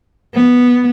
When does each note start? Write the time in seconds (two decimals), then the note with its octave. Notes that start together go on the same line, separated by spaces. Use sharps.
0.34 B3